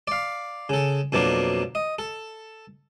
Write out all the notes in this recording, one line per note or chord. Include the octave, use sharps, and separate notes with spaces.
D5 F5
C#3 A4
F2 B2 F#3 A#3 D4
D#5
A4